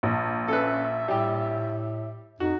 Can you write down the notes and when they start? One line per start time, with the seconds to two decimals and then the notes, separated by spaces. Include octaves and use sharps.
0.03 A#1
0.48 C#4 A4 B4 E5
1.08 A2 G3 G4
2.40 F2 D#4 F#4